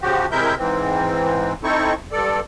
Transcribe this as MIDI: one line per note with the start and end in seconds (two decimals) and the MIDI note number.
0.01 0.26 49
0.01 0.26 53
0.01 0.26 66
0.01 0.26 67
0.31 0.55 48
0.31 0.55 56
0.31 0.55 64
0.31 0.55 70
0.31 0.55 76
0.31 0.55 91
0.58 1.53 44
0.58 1.53 52
0.58 1.53 60
1.63 1.94 60
1.63 1.94 63
1.63 1.94 64
1.63 1.94 69
1.63 1.94 85
2.12 2.40 43
2.12 2.40 69
2.12 2.40 74